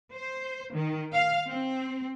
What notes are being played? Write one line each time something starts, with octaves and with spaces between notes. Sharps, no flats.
C5
D#3
F5
C4